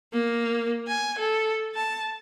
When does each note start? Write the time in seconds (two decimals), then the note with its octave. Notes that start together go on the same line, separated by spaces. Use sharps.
0.13 A#3
0.88 G#5
1.18 A4
1.75 A5